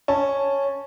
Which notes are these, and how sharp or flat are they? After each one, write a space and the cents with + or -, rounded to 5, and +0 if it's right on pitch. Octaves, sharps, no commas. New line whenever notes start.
C#4 -5 A5 +0